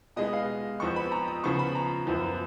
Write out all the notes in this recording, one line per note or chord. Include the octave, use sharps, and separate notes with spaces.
B2 G#3 B3 D#5
F5
F2 F3 B3 C#6
B5
A#5
D#6
C#3 F3 B3 C#6
B5
A#5
F#2 F3 B3